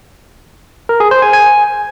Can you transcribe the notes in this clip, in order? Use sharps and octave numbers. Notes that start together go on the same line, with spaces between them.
A#4
G#4
C5
G#5
G#5